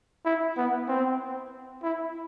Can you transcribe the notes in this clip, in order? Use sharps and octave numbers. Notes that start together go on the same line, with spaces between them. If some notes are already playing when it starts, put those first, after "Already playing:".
E4
B3
C4
E4